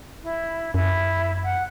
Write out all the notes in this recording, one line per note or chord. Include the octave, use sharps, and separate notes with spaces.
E4
F#2 E4
F#5